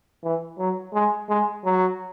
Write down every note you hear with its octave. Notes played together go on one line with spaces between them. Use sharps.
E3
F#3
G#3
G#3
F#3